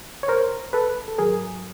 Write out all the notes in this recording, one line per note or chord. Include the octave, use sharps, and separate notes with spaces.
C#5
A#4 C5
A4 B4
A4
G#2 D#3 F#3 G#4 A#4